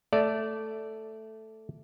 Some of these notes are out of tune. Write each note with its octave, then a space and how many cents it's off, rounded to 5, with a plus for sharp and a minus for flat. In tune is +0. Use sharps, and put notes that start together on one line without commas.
A3 +0 D5 -10